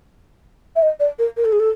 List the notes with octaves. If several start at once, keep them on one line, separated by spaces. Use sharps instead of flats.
E5
D#5
D5
A#4
A#4
A4
G#4
A4